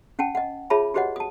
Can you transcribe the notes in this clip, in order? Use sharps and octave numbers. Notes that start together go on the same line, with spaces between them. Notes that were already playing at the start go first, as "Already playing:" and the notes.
C#4 F#5 G5 A5
D#5 F#5
F4 G#4 C#5 E5 A5 B5
F#4 G4 B4 C#5 D#5 F#5
A5 D#6